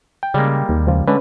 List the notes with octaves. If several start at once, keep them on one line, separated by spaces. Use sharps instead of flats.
G5
C#3 G3 G#3 A#3
D#2
C#2 F3 F4
D3 G#3 C#4 B4